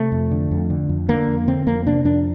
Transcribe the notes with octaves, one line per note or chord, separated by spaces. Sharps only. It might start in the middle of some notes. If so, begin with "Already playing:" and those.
Already playing: C3 A3
F2
D3
F2
D3
F2
D3 A#3
F2
D3 C4
F2 A#3
C3 D4
F2 D4